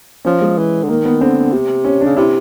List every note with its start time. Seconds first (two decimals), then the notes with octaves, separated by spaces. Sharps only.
0.25 F3 C#4
0.42 G#3
0.58 E3
0.83 D3
0.89 D#3 A#3
1.05 B3
1.21 D3 C4
1.53 C3
1.85 C#4
2.01 D4
2.05 C#3
2.17 C3 E4